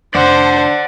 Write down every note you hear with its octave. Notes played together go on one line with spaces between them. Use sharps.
F1 D4 C5 D5 F#5